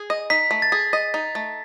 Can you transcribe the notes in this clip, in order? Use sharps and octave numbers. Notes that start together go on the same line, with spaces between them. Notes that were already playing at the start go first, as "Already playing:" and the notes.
Already playing: G#4
D#5
D#4 B6
A3
A6
G#4
D#5
D#4
A3